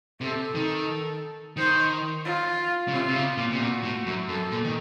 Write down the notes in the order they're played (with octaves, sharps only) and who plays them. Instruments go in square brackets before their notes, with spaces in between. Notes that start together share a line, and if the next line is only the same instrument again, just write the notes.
[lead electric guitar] C3 [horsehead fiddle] A4
[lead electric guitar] D#3
[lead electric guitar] D#3 [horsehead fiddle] C5
[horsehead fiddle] F4
[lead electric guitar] C#3
[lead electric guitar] C3 [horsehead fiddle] F4
[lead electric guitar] C3
C#3
A#2
C3
[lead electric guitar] A#2 [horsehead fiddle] F#4
[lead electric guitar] A2
F#2
[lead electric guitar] F#2 [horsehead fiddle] A4
[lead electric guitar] A#2
D#3